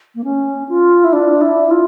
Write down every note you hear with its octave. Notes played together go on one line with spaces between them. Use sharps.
A#3
C#4
F4
E4
D4
E4
F4